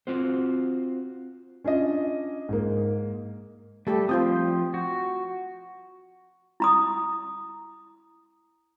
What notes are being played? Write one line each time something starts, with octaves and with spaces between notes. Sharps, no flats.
C4 F4 F#4 C5
C#4 D4 F4 D#5
G#2 A#3
G3 A3 G4 A4
F3 C4 F4 C5 G5 D#6
F#4
E4 A#5 D#6